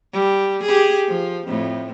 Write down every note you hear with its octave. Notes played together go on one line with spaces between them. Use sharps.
G3
G4 G#4
F3
F2 A2